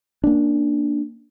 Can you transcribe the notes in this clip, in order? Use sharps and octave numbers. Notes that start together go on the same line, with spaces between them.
A#3 C#4 D4